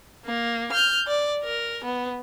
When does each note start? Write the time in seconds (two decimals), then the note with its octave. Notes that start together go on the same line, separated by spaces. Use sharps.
0.25 A#3
0.72 F6 G6
1.07 D5
1.43 A#4
1.84 B3